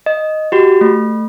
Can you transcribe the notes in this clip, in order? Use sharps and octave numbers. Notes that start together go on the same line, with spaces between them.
D#5
F#4 G4
A3